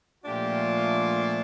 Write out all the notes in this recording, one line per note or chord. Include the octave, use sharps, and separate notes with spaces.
A#2 F3 A3 D4 F4 G4